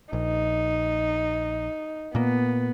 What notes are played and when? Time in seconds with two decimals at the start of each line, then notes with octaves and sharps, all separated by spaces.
0.13 A#1 D#4
2.15 A#2 A#3 B3